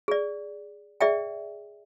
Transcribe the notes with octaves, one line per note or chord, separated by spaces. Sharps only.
G#4 D5
G#4 D5 E5 G5